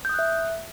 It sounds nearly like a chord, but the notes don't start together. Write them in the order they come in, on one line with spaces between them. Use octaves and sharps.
G6 D#6 F#6 E5